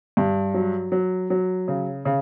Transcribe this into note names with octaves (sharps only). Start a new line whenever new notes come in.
G2
F#3
F#3
F#3
C#3
C#3